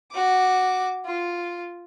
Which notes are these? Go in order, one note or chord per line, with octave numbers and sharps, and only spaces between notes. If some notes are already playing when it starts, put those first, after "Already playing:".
F#4 D6
F4